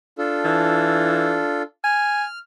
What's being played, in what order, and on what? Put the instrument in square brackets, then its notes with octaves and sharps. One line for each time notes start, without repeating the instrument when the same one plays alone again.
[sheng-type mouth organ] D4 F4 A4
[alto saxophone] E3
[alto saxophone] G#5 [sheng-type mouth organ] F6